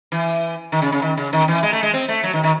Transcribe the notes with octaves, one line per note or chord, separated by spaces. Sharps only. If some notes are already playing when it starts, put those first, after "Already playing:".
E3
D#3
C#3
C#3
D#3
C#3
D#3
E3
G#3
A3
G#3
C4
A3
F#3
D#3
D#3